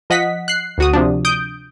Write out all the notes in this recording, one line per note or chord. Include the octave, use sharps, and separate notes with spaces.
F3 D#5 F#5 B6
F#6 C7
D2 F#4 D#6
C3 F3 D4
D#6 G6 D7